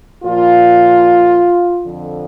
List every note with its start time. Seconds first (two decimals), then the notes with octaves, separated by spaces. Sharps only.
0.24 A#2 F3 F4
1.83 F2 D3 F3